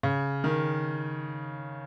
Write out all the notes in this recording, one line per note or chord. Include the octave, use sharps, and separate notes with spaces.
C#3
D#3